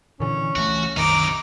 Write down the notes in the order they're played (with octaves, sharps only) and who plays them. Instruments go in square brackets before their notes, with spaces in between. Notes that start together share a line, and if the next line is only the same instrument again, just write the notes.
[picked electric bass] A#2 D3 E3 [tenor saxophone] C#4
[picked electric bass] C#2 E3 A3 [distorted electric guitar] F#4
[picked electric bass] C2 F#2 D#3 [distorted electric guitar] C3 D#4 [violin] A#5 D6